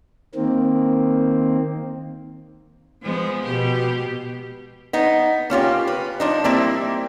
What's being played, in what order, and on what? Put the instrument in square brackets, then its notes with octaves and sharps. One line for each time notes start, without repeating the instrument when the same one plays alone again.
[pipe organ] D#3 A#3 C4
[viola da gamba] F3 G#3 B3
B2 G4
[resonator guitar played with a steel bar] B3 D#4
A#3 C#4 F4 G4
B4
F3 D4 D#4
G3 A#3 C4 E4